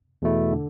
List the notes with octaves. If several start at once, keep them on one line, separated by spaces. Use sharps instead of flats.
E2 B2 A3 E4
D3